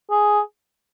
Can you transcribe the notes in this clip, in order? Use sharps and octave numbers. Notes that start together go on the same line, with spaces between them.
G#4